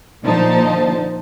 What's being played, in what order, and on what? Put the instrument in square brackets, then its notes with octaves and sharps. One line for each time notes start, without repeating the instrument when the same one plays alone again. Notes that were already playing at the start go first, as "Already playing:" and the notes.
[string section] A#2 D3 F3 D#4 C5 A5